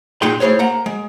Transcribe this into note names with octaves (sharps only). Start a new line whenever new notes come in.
A#2 G#3 D#4 G#4 G5 C6
A3 E4 G#4 C5 C#5
A#3 F#5 A#5
G#3